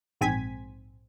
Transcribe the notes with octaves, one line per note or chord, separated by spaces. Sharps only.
A#1 G#2 C4 G#5 G#6 B6